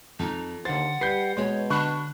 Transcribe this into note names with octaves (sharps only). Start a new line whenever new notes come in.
F2 D#4
D#2 D3 C5 F#5 A6
G3 B4 G6 C7
B2 G#3 C#5
D3 D4 B5 C#6 F#6